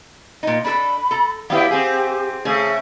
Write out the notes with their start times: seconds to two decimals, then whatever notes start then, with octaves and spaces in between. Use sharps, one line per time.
0.43 A#2 D#4
0.65 D4 A4 B5
1.11 A4 A#5
1.50 F#3 B3 E4 G4 F5 G5
1.71 C4 G#4
2.45 C#3 A3 G#4